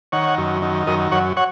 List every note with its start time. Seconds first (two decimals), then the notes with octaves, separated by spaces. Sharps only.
0.12 D#3 C#5 F#5
0.38 F#2
0.62 D#3
0.87 F#2 A#4 D#5
1.12 F#2 C#5 F#5
1.37 C#5 F#5